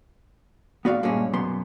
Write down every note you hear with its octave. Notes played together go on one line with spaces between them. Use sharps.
B3 F#4 D5 F5
G2 A#2 G#3 A#3 C#4
F#2 B2 B3 C6